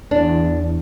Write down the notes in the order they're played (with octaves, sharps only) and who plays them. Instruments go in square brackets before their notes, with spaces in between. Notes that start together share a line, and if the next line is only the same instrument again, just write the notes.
[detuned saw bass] E2 [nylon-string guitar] D4